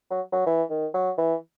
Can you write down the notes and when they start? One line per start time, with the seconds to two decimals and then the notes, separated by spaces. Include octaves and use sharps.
0.10 F#3
0.32 F#3
0.46 E3
0.70 D#3
0.94 F#3
1.18 E3